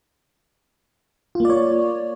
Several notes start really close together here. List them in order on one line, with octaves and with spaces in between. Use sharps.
F4 A#3 D5 C#5